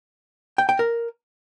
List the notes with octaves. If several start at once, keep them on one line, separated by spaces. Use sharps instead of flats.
G5
G5
A#4